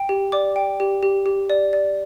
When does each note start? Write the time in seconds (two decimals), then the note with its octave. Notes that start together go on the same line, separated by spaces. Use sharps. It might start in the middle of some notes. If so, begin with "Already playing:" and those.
Already playing: G5
0.09 G4
0.32 D5 D6
0.56 G5
0.80 G4
1.03 G4
1.26 G4
1.50 D5
1.73 D5